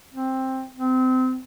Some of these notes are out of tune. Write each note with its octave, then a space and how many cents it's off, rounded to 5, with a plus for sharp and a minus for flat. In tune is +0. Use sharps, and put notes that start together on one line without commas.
C4 +10
C4 -25